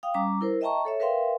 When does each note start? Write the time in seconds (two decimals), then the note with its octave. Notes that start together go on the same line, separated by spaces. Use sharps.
0.03 F5 G5 D#6
0.14 G3 C#4 A#5 D6
0.41 E4 A#4 C5
0.61 D#5 E5 G5 A5 A#5 C#6
0.85 A4 C#5 E5
1.00 A#4 B4 E5 F5 G5 C6